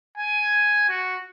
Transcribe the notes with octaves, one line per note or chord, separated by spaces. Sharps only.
G#5
F#4